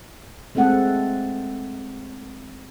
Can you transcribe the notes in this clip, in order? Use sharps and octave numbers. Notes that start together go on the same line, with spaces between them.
G#3 A3 C4 A4 F#5